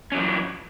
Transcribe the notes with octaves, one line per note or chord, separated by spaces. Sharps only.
E3 F#3 C#4